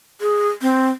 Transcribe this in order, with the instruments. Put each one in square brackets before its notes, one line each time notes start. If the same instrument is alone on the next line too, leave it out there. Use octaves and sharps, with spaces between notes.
[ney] G#4
C4